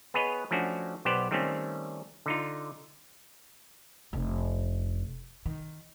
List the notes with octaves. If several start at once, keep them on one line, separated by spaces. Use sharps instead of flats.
B3 G#4 B4 C#5 D#5
F3 A3 C#4 D4 F#4
B1 B3 G4 C5 D5 F#5
D#3 G3 A3 C4 C#4
D3 D#4 F4
F1 D4
D#3